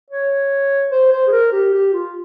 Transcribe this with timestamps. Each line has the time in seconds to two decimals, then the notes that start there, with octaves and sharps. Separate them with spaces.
0.11 C#5
0.92 C5
1.12 C5
1.27 G#4
1.32 A#4
1.52 G4
1.73 G4
1.93 F4